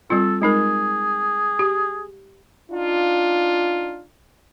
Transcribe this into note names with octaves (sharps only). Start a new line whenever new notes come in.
G3 C4 F4 A4
G#3 D#4 G#4 A#4
G4
D4 D#4 F4